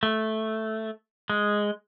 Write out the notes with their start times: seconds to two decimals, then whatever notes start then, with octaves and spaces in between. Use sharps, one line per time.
0.03 A3
1.30 G#3